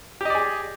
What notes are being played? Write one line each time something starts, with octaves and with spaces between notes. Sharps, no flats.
G4 G#4 D5 D#5